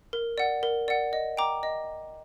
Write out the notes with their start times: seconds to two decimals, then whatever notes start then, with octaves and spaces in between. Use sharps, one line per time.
0.13 A#4
0.38 D5 F#5
0.63 A#4
0.88 D5 F#5
1.13 D#5
1.37 G5 A#5 D6
1.63 D#5